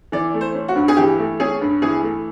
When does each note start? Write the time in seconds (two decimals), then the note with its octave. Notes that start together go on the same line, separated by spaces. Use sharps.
0.12 E3 D5
0.34 A3
0.41 C5
0.54 C#4
0.68 F#4
0.75 G2
0.88 G#4
0.97 E3 G4
1.19 A3
1.40 C#4 G#4
1.61 G2
1.82 E3 G#4
2.03 A3